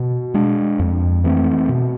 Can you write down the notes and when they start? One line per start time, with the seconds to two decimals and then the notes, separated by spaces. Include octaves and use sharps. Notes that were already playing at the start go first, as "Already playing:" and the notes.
Already playing: B2
0.34 G#3 D4
0.79 F2
1.24 E3 A3 C4
1.69 B2